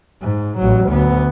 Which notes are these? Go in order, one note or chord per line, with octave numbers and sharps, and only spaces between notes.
G#2
A1 F#3
D2 B3